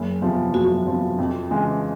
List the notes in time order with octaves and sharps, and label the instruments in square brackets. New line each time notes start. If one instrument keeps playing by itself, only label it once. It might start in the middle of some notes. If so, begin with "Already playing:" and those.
Already playing: [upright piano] F#1
E2 C3 F3
[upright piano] F#1 [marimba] F#4
[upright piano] E2 C3 F3
F2
C#3 E3 G#3